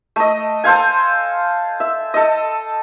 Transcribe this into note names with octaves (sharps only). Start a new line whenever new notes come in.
A3 D#5
A4 C5 F5 G#5
E5
A4 D#5